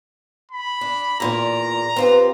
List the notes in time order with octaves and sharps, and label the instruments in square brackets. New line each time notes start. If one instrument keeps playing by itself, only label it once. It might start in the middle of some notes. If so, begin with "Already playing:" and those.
[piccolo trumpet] B5
[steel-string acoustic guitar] D4
[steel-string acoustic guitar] E2 A#2 D5 [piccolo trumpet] A#5
[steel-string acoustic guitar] C4 F4 G4 [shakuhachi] B4